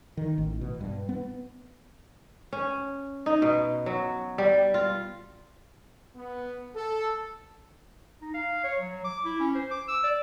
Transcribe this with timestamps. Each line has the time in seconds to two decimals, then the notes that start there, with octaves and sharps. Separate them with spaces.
0.17 D#3
0.38 A1
0.61 B2
0.81 G2
1.09 B3
2.53 C#4
3.26 D#4
3.42 B2
3.86 F#3
4.38 G3
4.74 F4
6.16 B3
6.75 A4
8.22 D#4
8.34 F5
8.64 C#5
8.80 F#3
9.05 D6
9.25 E4
9.40 C#4
9.55 C5
9.71 D6
9.88 E6
10.04 D5